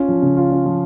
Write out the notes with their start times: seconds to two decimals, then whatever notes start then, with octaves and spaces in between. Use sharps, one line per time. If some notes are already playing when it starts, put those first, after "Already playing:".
Already playing: C#4 F4
0.08 F3
0.22 C#3
0.37 F4
0.52 C#4
0.66 F3